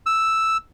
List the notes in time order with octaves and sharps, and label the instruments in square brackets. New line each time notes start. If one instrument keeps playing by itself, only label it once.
[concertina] E6